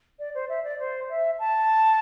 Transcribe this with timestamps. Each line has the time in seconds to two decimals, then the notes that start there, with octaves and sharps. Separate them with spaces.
0.19 D5
0.35 C5
0.49 E5
0.64 D5
0.79 C5
1.10 E5
1.39 A5